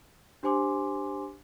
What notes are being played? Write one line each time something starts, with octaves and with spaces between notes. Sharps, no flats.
D4 G4 C5 G#5 C6 D6